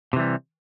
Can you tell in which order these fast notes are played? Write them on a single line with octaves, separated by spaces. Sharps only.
C3 E3 G3